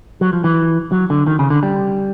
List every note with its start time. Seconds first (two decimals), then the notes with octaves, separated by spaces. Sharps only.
0.21 F#3
0.33 F3
0.44 E3
0.92 F#3
1.10 D3
1.27 D#3
1.39 C#3
1.50 D3
1.63 G3